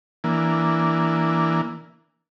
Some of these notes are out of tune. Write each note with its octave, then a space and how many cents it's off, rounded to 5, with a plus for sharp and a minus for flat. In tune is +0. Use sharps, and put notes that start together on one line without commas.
E3 +0 A#3 +0 D4 +0